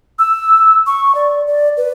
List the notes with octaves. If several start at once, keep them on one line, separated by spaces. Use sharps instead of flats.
E6
C#6
D5
D5
B4